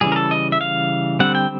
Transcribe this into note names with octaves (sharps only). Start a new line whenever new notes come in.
C#3 E3 G3 G#4
A#4
A4
D#5
E5
F5
D3 G3 C4 F#5
G5